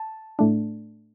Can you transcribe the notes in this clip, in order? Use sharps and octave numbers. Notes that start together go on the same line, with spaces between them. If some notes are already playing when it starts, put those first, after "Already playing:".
Already playing: A5
A2 A3 D4